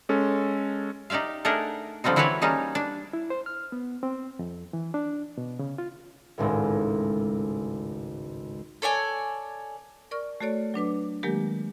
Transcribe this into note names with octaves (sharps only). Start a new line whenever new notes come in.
G#3 C#4 A4
D#4 G4 D5 E5 F5
A3 D4 D#4 G#4 A#4 F#5
D3 F3 G3 C4 D#4
E3 E4 F#4 B4 C#5 D5
G3 A#3 C#4 D#4 G#4 A5
D4
E4
C5
F6
B3
C4
F2
E3
D4
B2
C#3
F4
G#1 C#2 A2
A4 C#5 D5 G#5
A#4 D5 C#6 F6
A3 F#4 A4 C#5 D5
F#3 D4 B4 D6
D#3 F#3 G#3 A#3 G4 A#4